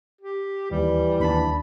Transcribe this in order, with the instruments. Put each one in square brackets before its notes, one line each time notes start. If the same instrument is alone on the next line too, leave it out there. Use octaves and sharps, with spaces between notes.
[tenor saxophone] G4
[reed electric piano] D#2 [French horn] E3 [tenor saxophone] G3
[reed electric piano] D#2 D4 A5 [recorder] B5